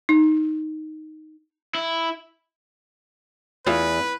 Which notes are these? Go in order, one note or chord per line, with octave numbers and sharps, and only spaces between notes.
D#4
E4
E2 A3 F4 B4 F5